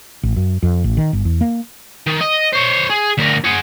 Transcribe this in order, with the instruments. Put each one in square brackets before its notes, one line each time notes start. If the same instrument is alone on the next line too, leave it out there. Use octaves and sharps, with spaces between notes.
[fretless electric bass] A1
F#2
F2
A1
D#3
G1
E2
A#3
[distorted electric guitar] D#3
D#5
C5 C#5
G#4
D2 A#4
G#4 F#5